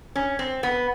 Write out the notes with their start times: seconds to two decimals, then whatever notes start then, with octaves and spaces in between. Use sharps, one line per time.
0.16 C#4
0.39 C4
0.63 B3